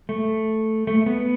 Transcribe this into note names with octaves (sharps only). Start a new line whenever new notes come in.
A3
A3
B3